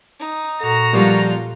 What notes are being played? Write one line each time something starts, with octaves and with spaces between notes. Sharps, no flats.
D#4
A#2 F#4 A4 A#5
F3 G3 A#3 F4 G4